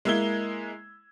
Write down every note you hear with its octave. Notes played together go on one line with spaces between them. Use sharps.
G#3 A#3 E4 E6 G#6 G7